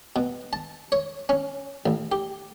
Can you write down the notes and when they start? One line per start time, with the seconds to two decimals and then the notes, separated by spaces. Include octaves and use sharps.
0.16 B2
0.53 A5
0.92 C#5
1.29 C#4
1.86 A1
2.12 G4